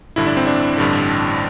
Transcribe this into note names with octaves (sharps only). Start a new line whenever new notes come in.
A1 G2 D3 E4
D4
C4
D4
A1 G2 D3